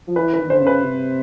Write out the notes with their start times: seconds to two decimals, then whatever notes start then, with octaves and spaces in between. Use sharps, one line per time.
0.07 F3
0.16 E3 B4
0.34 D#3 B4
0.49 D3 C5
0.61 C#3
0.67 B4
0.82 C3